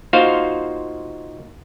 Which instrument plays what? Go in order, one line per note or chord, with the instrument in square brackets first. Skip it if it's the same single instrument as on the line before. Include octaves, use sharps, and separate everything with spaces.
[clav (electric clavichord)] A#3 D#4 F4 F#4 C5 F5